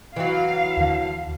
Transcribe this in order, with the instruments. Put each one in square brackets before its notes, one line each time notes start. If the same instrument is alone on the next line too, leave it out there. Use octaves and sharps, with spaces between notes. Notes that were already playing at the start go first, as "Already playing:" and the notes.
[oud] E3 F#3 [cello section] F5
[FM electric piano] D#2 D3